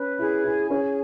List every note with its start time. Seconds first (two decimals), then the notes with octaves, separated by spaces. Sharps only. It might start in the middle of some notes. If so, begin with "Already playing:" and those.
Already playing: C#4 B4
0.19 E4 G#4
0.44 E4 G#5
0.70 C#4 G#4